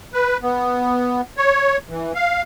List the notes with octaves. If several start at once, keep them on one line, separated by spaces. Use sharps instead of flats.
B4
B3
C#5
E3
F5